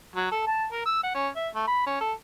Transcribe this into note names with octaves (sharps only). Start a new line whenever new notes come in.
F#3
A4
A5
A#4
E6
F#5
C#4
E5
A3
B5
C#4
A4